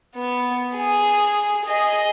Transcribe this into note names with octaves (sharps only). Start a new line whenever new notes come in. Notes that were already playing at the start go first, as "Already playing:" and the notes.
B3
G#4
G#4 D#5